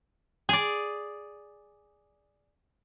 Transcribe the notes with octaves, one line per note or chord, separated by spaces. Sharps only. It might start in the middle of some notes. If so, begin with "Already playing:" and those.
G#4 D5